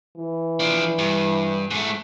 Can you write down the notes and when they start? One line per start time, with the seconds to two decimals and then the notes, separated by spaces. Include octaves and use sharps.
0.16 E3
0.60 F3 D4
0.98 G2
1.70 G#2 A3